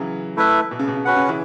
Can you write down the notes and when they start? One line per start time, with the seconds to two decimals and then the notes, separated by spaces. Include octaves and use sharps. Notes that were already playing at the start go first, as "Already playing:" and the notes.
Already playing: C#3 E3 F#3
0.37 A3 E4 B4 E5
0.71 B2
0.79 C#3
0.88 B2
0.96 C#3
1.05 C#4 F#4 B4 F#5
1.16 C#3
1.29 E3